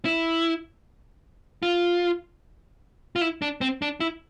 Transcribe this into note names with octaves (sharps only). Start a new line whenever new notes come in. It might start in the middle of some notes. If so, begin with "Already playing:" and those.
E4
F4
F4
E4
D4
C4
D4
E4